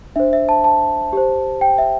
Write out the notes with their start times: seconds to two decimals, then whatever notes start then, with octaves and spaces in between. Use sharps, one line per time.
0.16 D4 C5 E5
0.33 E5
0.49 A5
0.64 A5
1.13 G4 C5
1.61 G5
1.78 E5